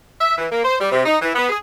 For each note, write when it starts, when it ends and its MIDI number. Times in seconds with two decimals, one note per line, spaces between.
0.21 0.38 76
0.38 0.46 52
0.51 0.61 58
0.64 0.75 72
0.80 0.90 55
0.92 1.03 48
1.05 1.17 63
1.22 1.30 52
1.35 1.46 59
1.49 1.57 68